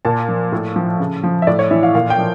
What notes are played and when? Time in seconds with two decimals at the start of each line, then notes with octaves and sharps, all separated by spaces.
0.05 A#2 A5
0.28 F3
0.52 A2
0.76 F3
1.00 C#3
1.23 F3
1.42 E5
1.47 A2 D5
1.59 C#5
1.71 E3 E5
1.83 F5
1.95 A#2 F5
2.10 G5
2.19 F3